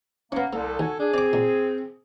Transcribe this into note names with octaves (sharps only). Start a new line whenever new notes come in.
A#3 B3 C#4
C2 A#3 A4
D#2 F#4 G#5
D4 G#4
C4 D5 D6
A#2